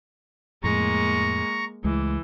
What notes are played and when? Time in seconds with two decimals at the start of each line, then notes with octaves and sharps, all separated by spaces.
0.64 F2 A2 G#3 A#3 A#5 C#6
1.84 C#2 E3 G#3 A3